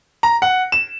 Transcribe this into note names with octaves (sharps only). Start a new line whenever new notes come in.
A#5
F#5
E7